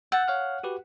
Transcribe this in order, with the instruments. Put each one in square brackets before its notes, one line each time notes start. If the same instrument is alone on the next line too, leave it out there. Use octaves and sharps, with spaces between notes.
[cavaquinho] F#5 [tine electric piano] E6 G6 A6
[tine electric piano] C#5 F5 F6
F#4 G4 B4